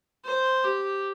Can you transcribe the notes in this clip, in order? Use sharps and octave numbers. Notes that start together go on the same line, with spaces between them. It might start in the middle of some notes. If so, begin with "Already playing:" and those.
C5
G4